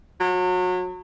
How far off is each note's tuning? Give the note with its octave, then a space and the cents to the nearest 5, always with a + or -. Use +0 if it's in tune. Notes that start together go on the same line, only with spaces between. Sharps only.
F#3 -30